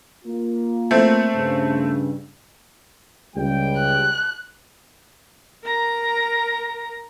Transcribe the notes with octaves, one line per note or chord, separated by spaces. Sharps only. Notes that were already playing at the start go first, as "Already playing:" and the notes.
A#3 F4
A3 C4
G2 C#3
C#2 G3 G5
F#6
A#4 A#5